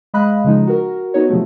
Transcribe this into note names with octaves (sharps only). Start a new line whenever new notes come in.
G#3 D#5 F5 B5 F#6
C#3 F3 G#3 D#4
F#4 A#4
B3 D#4 F#4 C#5
C3 F3 F#3 A3